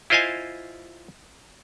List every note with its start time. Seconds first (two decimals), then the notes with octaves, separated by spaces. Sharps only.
0.10 E4 F4 C5 D#5 F5 G#5